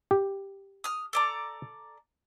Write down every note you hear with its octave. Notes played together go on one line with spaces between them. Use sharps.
G4
D#6 F6
A4 D5 A#5